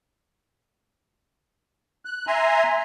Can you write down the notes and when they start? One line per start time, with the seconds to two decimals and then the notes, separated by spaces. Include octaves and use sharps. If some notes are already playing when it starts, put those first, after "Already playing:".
2.05 F#6
2.27 E5 G#5 A#5 C6